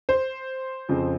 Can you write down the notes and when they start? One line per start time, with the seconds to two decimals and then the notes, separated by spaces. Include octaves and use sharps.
0.09 C5
0.89 F2 C#3 F3